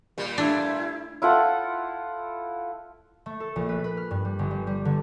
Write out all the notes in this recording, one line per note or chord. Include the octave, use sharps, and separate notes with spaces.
A#2 G3
A3 D4 E4
E4 F4 A4 F#5
A3
A4
A#1
B4
B4
F6
G2
G3
G1
G3
G3
D3